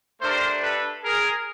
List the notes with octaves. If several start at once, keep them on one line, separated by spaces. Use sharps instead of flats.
A3 D4 G4 A#4 C5
A4 B4
G#4 A#4